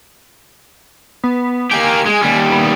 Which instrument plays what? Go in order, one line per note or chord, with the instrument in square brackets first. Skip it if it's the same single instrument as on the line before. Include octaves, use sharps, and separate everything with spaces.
[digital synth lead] B3
[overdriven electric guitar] A#3 G4 [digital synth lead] G#5
[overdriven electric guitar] G#3
D#2 G3
[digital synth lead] B3